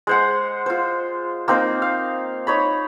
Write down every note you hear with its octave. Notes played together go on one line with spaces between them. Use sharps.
G#3 C5 F#5
F4 C5
A#3 C4 D#4 C5
F5
D#4 C#5 B5